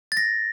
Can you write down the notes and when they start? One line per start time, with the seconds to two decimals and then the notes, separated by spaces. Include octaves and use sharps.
0.12 A6
0.17 A#6